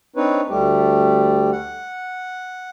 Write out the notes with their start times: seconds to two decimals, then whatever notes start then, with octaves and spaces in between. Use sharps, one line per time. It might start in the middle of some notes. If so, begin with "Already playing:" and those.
0.16 C4 D4 D#4 B4 C#5
0.50 D2 G3 A3 G4
1.52 F#5